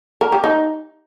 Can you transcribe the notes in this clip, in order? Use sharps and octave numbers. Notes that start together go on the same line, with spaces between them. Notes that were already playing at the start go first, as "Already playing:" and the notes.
A#4
G4
D#4